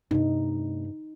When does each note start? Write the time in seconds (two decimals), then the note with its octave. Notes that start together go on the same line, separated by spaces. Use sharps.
0.11 G2 C3 A3 D#4